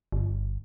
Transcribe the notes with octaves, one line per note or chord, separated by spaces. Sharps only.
G1